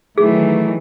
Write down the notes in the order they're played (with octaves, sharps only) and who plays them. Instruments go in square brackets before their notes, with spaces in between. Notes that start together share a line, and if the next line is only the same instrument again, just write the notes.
[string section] D#3 E3 F#3 [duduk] A3 [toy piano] G#4